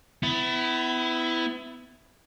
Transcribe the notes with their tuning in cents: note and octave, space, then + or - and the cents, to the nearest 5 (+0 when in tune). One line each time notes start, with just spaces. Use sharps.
B3 +35 E4 +0